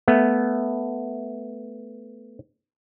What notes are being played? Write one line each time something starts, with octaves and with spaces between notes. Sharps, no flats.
A3 B3